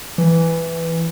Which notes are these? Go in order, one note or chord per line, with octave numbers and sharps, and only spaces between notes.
E3